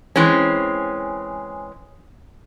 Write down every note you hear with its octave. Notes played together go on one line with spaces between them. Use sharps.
E3 G#3 C4 C#4